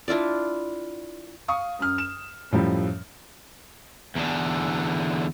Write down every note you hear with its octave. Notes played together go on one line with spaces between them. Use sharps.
D4 E4 F4 D5
F5 C#6 D#6
F#2 F6
E7
F#2 A2 F3 G3
E2 D3